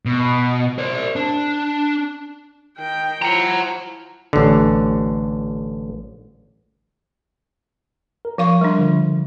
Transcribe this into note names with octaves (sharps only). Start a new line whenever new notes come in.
B2
C5 D5
D4
D#3 G5
F3 E4 F#5 A#5
A1 D3
A#4
F3 F5 C#6
G3 D4 A#4 C6
D3 F3